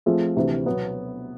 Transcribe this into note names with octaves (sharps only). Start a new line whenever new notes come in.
F3 A3 C4 F4 G#4
D2 C3 E3
B2 F#3 B3